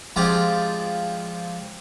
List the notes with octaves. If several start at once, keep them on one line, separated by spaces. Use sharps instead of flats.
F3 G#3 C4 F4 G4 D5